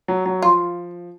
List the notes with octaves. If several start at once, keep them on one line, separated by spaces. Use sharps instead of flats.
F#3
F#3
F3 F4